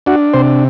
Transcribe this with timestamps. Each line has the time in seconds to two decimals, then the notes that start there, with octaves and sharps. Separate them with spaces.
0.06 D4 F#4
0.33 C3 C5